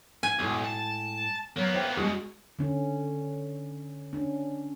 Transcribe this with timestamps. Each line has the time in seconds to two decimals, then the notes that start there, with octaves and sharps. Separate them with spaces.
0.23 G#5
0.39 B1 A2 G#3
0.64 A5
1.56 F#3 A#3 B3
1.74 C5 E5 G5
1.97 E2 B2 G#3 F#4 G#4
2.59 D3 C#4
4.13 C#4 D4